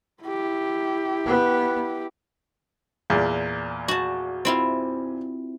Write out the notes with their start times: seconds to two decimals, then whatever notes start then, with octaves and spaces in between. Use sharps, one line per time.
0.23 E4 G4
1.26 B3
3.10 E2 A#2
3.88 F#4 A5
4.45 C4 E4 F4